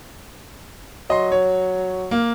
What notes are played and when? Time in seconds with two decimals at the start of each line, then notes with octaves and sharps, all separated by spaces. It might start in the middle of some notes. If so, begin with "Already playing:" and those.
1.10 F#3 D#5 C6
1.32 C#5
2.11 A#3